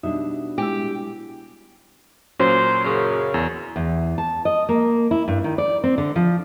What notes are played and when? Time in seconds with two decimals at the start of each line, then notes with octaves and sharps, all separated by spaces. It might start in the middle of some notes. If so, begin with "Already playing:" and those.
0.03 B2 G3 D4 D#4 E5
0.58 G#3 E4 G4
2.39 A#2 F#3 C#4 C5
2.84 F#2 C#3
3.34 E2
3.76 E2
4.18 A5
4.45 D#5
4.69 A#3
5.11 E4
5.28 G2
5.44 D#3
5.58 D5
5.84 C4
5.98 D3
6.16 F3